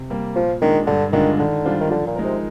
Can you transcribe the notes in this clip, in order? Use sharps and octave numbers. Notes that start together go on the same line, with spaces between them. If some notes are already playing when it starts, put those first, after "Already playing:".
Already playing: C3
G3 A#3
A#2 F3
D#3 G#3 D4
G2 D3
D3 D#3 G#3 D4 F4
D3 D#3
G3 D4 F4 C5
D#3
D3 F3
A#2
G#3 D#4 A#4
C3